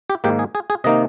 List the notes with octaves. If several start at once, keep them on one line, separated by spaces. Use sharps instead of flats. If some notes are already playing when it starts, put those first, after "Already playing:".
G4
G#2 D#3 A#3 G4
G#4
G#4
G#4
C3 D#3 A#3 D#4 D#5